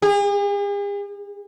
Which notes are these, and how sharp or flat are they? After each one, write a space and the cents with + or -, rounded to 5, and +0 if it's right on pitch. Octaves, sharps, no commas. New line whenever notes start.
G#4 -45